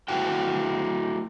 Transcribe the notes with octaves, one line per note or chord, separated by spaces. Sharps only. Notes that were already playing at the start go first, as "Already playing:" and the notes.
A3 E4 F#4 G5